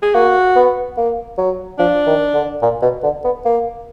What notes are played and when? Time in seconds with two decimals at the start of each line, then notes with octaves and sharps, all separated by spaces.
0.02 G#4
0.14 A#3 F#4
0.56 B3
0.97 A#3
1.38 F#3
1.79 F3 D4
2.06 D#3
2.34 D3
2.62 A#2
2.82 B2
3.03 D3
3.24 B3
3.45 A#3